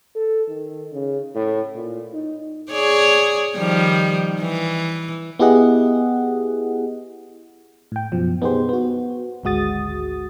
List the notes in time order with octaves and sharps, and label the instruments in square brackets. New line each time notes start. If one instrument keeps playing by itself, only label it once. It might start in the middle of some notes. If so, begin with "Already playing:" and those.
[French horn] A4
D#3
C#3
A2
A#2
D#4
[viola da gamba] G#4 C#5 D5
D#3 F3 G3
E3
[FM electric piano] B3 E4 G4 G#4 D#5 F#5
A2 G5
F#2 B2 F3
B3 D#4 G4 G#4 C5
B3 F#4
G#1 D2 G#3 F#4 D#6 A6